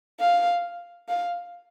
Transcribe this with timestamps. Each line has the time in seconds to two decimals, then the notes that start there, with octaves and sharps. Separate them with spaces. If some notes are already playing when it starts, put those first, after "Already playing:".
0.20 F5
1.08 F5